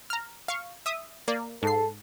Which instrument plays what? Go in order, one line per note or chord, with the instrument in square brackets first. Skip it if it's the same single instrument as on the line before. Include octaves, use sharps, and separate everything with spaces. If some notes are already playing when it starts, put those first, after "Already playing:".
[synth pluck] A#5 F6
F5 C#6
E5 D#6
A#3 D5
[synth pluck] G#2 C7 [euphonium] A4